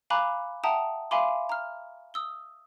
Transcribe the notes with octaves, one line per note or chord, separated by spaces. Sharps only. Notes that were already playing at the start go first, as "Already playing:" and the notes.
F5 G#5 A#5 B5 D6 F#6
E5 F#5 G5 A5 A#5 D#6
E5 F5 G#5 B5 C6 D6
A#5 F6
D#6 E6 G7